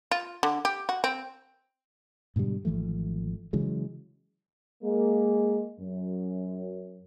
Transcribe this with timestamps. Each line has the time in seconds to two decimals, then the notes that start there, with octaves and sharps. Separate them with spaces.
0.11 F4
0.43 D3
0.65 G4
0.89 F#4
1.04 C4
2.36 G#2 B2 D3 G3
2.65 G#1 E3 F3 A3
3.53 C#3 E3 F#3 G#3
4.84 G#3 A#3
5.80 F#2